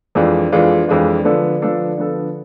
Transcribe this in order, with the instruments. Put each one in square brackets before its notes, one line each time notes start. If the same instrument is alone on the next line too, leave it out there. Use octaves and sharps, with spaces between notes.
[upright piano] F2 E3 G#3 D4 F4
F2 E3 G#3 D4 F4
F2 E3 G#3 D4 F4
D3 F3 B3 D4 A4
D3 F3 B3 D4 A4
D3 F3 B3 D4 A4